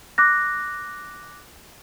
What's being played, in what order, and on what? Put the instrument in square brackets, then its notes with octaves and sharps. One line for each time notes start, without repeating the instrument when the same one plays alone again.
[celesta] D6 F#6 A#6